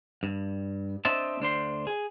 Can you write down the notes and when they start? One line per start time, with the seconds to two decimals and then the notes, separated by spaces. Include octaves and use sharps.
0.23 G2
1.05 C4 D4 C5 D#5 E5 A5
1.40 D2 D4 C5 C6
1.87 G#4